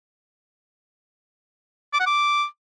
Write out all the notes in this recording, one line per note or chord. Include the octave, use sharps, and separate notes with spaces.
D6
F#5
D6